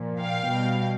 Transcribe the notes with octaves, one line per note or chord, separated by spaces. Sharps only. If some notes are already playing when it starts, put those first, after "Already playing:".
Already playing: A#2 F3
F5 G5
B2 G3